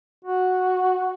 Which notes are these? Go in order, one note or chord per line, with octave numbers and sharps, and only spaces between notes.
F#4